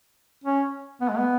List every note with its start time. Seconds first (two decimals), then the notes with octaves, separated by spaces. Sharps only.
0.44 C#4
1.01 B3
1.09 G#3
1.18 B3